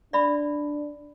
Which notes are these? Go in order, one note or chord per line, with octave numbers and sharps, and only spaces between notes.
D4 D5 E5 B5